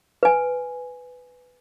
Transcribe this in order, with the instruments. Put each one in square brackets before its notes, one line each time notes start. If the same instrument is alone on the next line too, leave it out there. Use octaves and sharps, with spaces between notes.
[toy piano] B4 G#5